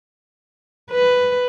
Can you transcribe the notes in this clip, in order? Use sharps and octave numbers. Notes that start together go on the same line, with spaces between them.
B4